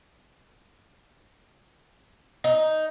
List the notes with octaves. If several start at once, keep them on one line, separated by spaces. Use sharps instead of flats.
D#4